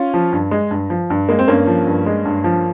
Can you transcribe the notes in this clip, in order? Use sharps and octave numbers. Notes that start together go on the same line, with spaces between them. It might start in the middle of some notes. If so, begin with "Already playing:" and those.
Already playing: C#4 F4
F3
G2
G#3
G2
F3
G2
G#3 A#3
C4
G2 A#3 C#4
F3
G2
G#3
G2
F3